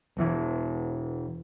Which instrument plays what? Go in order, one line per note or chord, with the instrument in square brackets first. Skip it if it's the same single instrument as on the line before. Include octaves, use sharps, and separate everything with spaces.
[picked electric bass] E1 E2 E3